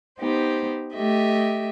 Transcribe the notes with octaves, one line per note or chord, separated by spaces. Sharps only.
B3 D#4 G4 C5
A3 G4 D#5 E5